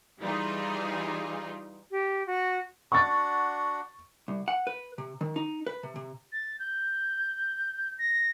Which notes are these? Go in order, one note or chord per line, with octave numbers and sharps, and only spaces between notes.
E3 G3 D#4 F4 G#4
G4
F#4
D4 F#4 F#5 C#6 A6
C2
F#5
B4
C3
D#3
D#4
B4
C3
C3
A6
G6
A#6